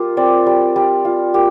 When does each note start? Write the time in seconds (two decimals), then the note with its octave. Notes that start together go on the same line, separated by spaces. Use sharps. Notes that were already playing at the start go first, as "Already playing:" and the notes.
Already playing: G3 F4 G4 A#4
0.17 C4 D5
0.46 G3
0.76 G3
1.05 F4
1.34 A#3 G4